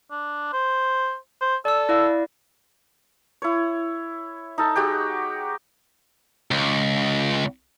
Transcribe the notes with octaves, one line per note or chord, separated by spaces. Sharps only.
D4
C5
C5
A4 D5 E6
E4 D5 F5
E4 C#5
D#4 A4
G#3 F#4 G4 G5
C#2